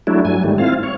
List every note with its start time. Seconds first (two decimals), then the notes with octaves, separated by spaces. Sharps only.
0.07 F#3 A3 D4 E4
0.25 G2 F#3 G#5
0.44 G#2 D#3 G3 A3
0.58 C4 E4 F4 F5
0.83 C#5